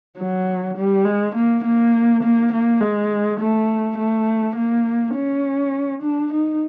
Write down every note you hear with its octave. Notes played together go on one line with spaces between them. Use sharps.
F#3
G3
G#3
A#3
A#3
A#3
A#3
G#3
A3
A3
A#3
C#4
D4
D#4